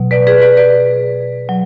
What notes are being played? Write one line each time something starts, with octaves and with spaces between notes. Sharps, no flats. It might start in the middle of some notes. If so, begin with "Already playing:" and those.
Already playing: B2 F#3
B4 D5
G#4 B4
B4 D5
B4 D5
F#3